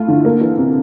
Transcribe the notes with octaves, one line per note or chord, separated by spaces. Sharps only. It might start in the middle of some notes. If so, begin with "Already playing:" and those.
Already playing: A3 E4 F4
D3
A#3
E3
C3